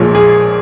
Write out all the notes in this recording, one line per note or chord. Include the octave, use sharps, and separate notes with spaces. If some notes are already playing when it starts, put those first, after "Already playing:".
Already playing: A#1 A#2 F3 G#3 C#5
G#4